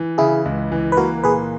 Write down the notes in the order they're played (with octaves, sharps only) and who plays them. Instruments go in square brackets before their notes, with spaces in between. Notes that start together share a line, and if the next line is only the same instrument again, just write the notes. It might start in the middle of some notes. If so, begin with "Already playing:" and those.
Already playing: [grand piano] E3
[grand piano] C#3 [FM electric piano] E4 G#4
[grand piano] C#2
E3
[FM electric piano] B4
[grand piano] A#3 [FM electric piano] F#4 A#4
[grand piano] A#2 [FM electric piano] G#4 B4